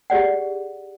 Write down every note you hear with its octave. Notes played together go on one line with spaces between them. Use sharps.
G4 G#4 D5 F#5